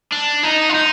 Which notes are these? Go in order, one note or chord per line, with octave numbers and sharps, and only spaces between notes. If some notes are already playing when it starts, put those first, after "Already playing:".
D4
D#4
F4
D#4